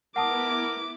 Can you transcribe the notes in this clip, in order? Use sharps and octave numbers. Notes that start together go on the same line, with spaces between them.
B3 E4 A#4 F#5 A5 D6 D#6